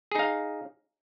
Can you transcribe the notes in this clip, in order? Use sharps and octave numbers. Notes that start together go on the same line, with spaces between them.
D#4 G#4 F5